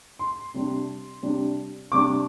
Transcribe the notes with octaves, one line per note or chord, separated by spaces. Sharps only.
C6
C3 G3 D4
C3 G3 D4
C3 G3 D4 D6